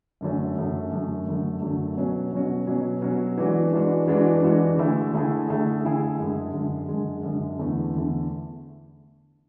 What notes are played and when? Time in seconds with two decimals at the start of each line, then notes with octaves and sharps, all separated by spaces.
0.21 F#2 D3 F#3 A3 C#4
0.56 F#2 D3 F#3 A3
0.91 F#2 D3 F#3 A3
1.27 F#2 D3 F#3 A3
1.62 F#2 D3 F#3 A3
1.97 B2 F#3 C#4 F#4
2.32 B2 F#3 C#4 F#4
2.67 B2 F#3 C#4 F#4
3.02 B2 F#3 C#4 F#4
3.37 E3 G#3 D4 F#4
3.72 E3 G#3 D4 F#4
4.08 E3 G#3 D4 F#4
4.42 E3 G#3 D4 F#4
4.77 D3 A3 E4 G#4
5.13 D3 A3 E4 G#4
5.48 D3 A3 E4 G#4
5.83 D3 A3 E4 G#4
6.19 F#2 D3 G#3
6.53 F#2 D3 G#3
6.88 F#2 D3 G#3
7.23 F#2 D3 G#3
7.59 E2 D3 A3
7.93 E2 D3 A3